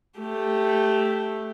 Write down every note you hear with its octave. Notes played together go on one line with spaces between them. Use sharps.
A3 G4